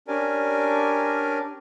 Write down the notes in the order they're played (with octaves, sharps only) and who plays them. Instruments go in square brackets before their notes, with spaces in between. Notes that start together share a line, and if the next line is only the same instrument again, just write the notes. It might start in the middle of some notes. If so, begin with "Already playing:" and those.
[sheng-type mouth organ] C#4 D4 G4 A#4 D5 G#5